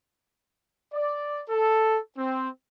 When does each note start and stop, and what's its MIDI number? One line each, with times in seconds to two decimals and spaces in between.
0.93 1.41 74
1.49 1.98 69
2.17 2.49 60